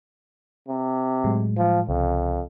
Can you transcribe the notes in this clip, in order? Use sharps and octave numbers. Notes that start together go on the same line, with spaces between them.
C3
A2 F#3 G#3
F3
C2 F2 C#3